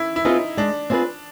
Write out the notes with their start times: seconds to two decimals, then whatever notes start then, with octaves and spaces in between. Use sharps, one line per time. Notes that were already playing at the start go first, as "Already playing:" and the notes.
Already playing: C#4 E4
0.16 E4
0.25 C4 D#4 F4 G#4 B4
0.57 G#3 D4
0.90 C4 F4 G#4 B4